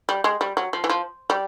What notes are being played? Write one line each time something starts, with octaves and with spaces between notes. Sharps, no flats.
G3
G#3
G3
F#3
F3
E3
F3
G3